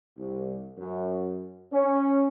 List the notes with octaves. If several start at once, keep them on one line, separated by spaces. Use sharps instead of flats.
C2
F#2
C#4